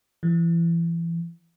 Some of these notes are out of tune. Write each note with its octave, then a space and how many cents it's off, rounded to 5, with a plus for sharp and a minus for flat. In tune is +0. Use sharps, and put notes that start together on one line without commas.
E3 +30